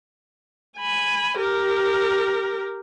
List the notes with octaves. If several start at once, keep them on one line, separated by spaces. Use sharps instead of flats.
G#5 B5
G4 A#4